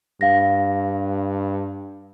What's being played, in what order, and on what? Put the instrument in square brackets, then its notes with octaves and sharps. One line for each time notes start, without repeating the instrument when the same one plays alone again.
[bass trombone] G2 [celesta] F5 A#6